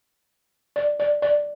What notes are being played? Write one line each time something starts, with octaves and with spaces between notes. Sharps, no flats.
D5
D5
D5